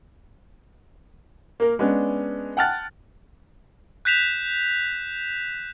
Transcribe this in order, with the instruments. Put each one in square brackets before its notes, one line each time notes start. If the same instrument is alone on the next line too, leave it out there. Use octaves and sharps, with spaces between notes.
[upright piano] A#3 A#4
G#3 B3 C#4 D4
F#5 G5 A5 F6 F#6 A6
[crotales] F#6 G6 B6 E7 F7